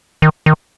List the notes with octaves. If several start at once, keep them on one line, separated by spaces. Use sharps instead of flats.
D#3
D#3